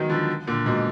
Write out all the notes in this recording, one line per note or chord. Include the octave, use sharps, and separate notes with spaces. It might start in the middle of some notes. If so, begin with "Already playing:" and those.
Already playing: D#3 F#3 G#3 B3
D3 F3
A#2 D3
G#2 B2